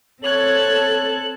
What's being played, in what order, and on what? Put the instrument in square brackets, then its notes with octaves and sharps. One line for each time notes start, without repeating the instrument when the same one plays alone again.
[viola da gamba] C4 A4 [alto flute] C#5 [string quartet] F#6 G#6 [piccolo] F#7